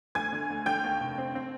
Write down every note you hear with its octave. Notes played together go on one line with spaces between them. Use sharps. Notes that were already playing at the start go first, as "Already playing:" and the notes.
D2 G#5 G#6
D3
D2
D3 G5 G6
D#2
F1
C4
C4